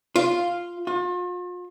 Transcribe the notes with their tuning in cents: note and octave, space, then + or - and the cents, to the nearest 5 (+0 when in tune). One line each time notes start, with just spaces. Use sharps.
F4 +0
F4 +40